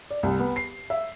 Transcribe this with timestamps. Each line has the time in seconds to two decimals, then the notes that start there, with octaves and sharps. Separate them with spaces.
0.10 D5
0.23 C2
0.39 B3
0.56 C7
0.90 E5